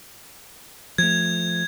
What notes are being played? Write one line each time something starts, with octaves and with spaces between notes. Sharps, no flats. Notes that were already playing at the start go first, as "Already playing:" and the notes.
F3 A3 G#6